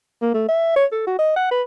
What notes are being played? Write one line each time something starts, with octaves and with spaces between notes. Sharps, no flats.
A#3
A3
E5
C#5
A4
F#4
D#5
F#5
B4